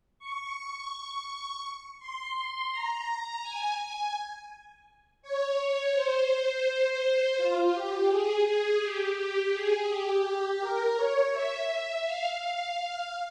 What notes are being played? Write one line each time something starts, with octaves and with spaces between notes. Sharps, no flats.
C#6
C#6
C6
A#5
G#5
G#5
C#5
C5
F4
G4
G#4
G#4
G4
G4
G#4
G4
A#4
C#5
E5
F5
F5